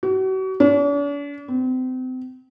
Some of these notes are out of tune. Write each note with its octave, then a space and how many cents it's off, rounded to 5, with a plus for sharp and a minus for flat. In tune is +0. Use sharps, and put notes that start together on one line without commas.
F#4 +40
D4 -45
C4 -35